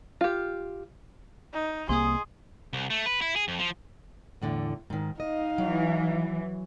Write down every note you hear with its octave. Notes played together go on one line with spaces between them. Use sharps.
F4 G4
D#4
C2 A#3 G#4 C6 D#6
C2
A3
B4
E4
G#4
F2
F3
E2 A2 D3
G#2 D#3
D#4 D#5 F5
E3 F#3